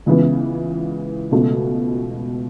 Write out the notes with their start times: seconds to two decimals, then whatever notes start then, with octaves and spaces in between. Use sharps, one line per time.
0.06 C#2 C#3 E3 B3
1.31 C#2 B2 A3